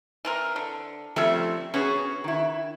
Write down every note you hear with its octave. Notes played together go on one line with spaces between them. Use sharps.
E3 C4 A#4
D3
F3 G3 A3 C4 C#4 E5
B3 C#4 F#4 G#4
D#3 E4